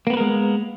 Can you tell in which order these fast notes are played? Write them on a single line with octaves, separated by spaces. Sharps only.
A#3 B3 B4 A#4 G#3